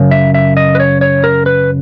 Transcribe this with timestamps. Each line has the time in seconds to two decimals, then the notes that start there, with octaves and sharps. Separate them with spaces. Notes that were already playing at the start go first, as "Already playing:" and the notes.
Already playing: F#2 C#3
0.11 E5
0.34 E5
0.57 D#5
0.75 B4
0.80 C#5
1.01 C#5
1.24 A#4
1.46 B4